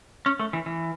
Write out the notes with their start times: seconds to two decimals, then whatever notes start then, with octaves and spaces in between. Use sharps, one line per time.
0.26 C#4
0.40 A3
0.53 E3
0.66 E3